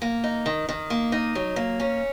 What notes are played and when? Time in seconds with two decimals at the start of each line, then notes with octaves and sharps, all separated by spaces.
0.02 A#3
0.24 D#4
0.46 D#3
0.69 D#3
0.90 A#3
1.12 D#4
1.35 F#3
1.56 A#3
1.80 C#4